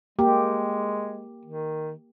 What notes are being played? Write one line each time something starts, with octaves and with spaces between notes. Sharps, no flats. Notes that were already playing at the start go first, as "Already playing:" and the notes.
G#3 A#3 G4
D#3